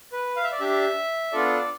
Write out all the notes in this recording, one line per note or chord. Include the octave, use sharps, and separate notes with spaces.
B4
F5
E5
D5
D4 G4 E5
B3 D4 F4 A4 D5